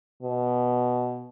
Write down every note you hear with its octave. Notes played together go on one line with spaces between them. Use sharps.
B2